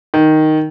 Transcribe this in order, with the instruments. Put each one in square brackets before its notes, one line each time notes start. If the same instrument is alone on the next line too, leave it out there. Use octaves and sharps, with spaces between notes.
[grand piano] D#3